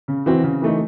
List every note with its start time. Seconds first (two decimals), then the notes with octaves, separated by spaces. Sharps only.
0.08 C#3
0.26 E3 C4 F#4
0.44 C#3
0.62 E3 A3 D#4